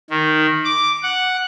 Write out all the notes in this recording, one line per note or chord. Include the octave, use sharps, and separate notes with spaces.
D#3
D6
F#5